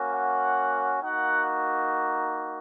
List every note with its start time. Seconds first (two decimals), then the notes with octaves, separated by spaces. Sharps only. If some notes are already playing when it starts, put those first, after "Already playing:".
Already playing: A#3 C#4 F#4
0.12 F#5
1.02 A#3 D#4 F#4 F#5